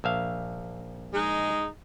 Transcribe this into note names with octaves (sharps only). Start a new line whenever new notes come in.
A#1 E5 F5
G#3 D#4 G#4